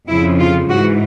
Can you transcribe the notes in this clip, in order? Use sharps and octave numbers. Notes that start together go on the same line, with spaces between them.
F2 C#3 F3 E4
F4
G#2 E3 F#4